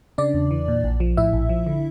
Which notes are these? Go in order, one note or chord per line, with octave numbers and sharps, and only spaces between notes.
C#3 D4 D5
E2
E3
A#2
A#1
F3
A2 E4 E5
A#1
F3
D3